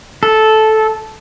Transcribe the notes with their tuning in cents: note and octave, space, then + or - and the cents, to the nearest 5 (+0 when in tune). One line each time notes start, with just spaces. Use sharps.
A4 -10